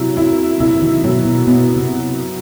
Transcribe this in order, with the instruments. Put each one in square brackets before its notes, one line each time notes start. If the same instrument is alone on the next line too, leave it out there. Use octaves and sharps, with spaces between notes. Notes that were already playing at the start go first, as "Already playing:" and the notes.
Already playing: [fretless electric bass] C3 [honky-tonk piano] F#3 E4
[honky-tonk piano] E4
[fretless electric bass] C3 [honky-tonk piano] E4
[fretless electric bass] D#3
[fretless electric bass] B2 [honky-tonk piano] F#3
[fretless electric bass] B2
[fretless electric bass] B2 [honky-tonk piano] B3
[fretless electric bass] C3